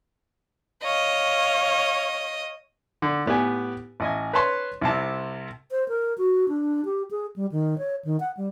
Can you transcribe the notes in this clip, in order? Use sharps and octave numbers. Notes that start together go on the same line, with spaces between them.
C#5 D#5 F5
D3
A2 B3 G4 G#5
A1 D#5 G#5
B4 C#5 A5 C6
C2 C3 A5
C5
A#4
F#4
D4
G4
G#4
G3
D#3
C#5
D#3
F#5
G3